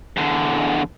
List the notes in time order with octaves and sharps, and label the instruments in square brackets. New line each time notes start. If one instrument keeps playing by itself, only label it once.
[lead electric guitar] E2 D3